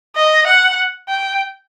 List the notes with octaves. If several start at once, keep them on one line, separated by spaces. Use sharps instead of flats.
D#5
F#5
G5